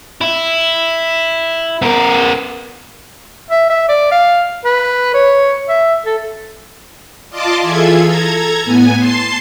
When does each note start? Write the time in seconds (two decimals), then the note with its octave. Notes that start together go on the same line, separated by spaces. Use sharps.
0.21 E4
1.82 B3 A#4
3.51 E5
3.70 E5
3.88 D5
4.11 F5
4.65 B4
5.14 C#5
5.69 E5
6.06 A4
7.29 F4 D5 D#5 A5 C6 D6
7.61 E3 F4 G#4 A4 E5 G#6
8.04 A4 A#5 G#6
8.64 A2 B3 G#5
8.99 A5 C6 C7